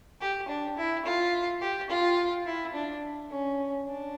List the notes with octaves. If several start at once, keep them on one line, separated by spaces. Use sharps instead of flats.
G4
D4
E4
F4
G4
F4
E4
D4
C#4
D4